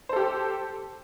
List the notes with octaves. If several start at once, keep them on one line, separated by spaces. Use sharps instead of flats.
G4 A4 C5